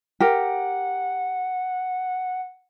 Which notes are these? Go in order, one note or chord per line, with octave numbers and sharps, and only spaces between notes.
G4 A#4 F#5